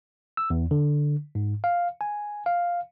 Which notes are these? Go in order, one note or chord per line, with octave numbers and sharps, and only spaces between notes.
E6
E2
D3
G#2
F5
G#5
F5